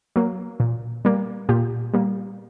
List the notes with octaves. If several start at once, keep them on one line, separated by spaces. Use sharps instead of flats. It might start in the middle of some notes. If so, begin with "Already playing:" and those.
F#3 A#3
A#2
G3 A#3
A#2 F4 G4
G3 A#3